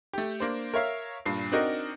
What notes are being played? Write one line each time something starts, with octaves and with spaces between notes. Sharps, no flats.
A3 G4
A#3 D4 C5
A#4 C#5 E5 F5
G2 A#2 C7
C4 D4 D#4 F#4 A#4 D#5